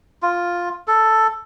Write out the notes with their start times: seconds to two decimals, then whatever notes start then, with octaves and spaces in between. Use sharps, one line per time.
0.22 F4
0.88 A4